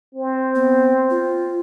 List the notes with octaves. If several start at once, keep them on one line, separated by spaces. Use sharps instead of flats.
C4
B3
F4